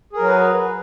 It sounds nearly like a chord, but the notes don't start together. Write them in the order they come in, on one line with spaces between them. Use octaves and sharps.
G#4 A#4 F#3 F#4 B4